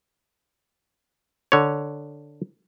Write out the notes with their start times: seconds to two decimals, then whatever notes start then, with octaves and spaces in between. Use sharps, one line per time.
1.52 D3 C#5